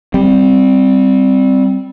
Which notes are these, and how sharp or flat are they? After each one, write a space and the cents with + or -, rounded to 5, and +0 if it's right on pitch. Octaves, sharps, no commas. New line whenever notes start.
G3 +0 C4 +0